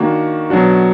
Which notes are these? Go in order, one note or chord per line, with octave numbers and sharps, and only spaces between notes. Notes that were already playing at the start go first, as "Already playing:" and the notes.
Already playing: D#3 A#3 D4 F#4
B2 F#3 D4 F#4